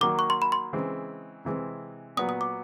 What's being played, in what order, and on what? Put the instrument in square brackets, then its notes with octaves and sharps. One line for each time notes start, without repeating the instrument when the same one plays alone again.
[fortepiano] D#3 F#3 A#3 [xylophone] D6
[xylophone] C#6
C6
B5
C6
[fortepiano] C#3 E3 G#3 C4
C3 E3 G#3 C4
[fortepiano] A#2 F#3 B3 [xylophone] D#6
[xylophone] D#6
D6